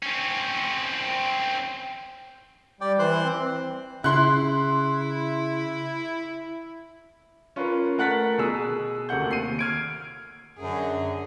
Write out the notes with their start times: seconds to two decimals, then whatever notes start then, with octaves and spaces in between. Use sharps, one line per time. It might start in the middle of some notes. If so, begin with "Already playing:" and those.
0.03 C4 C#4
2.81 G3 D5 G5
2.99 E3 C5 C6 F#6
3.24 C4
4.04 C#3 E4 C6 F#6
7.56 C#4 F4 A#4 B4
7.98 A3 A#4 F#5 F#6 A6 B6
8.38 B2 G#4 G#5 E6
9.09 D2 C3 A#3 F#5 G6
9.29 D#2 C7 D#7
9.59 F6 G#6 D7
10.58 F#2 D3 F#3 G#4